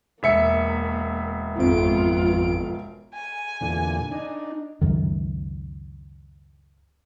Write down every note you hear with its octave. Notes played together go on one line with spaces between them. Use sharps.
E1 A#3 E5 C#7
G#1 F2 B3 F4 D7
G#5
E2 A#2 D3
D4 D#4
C#2 F#2 D#3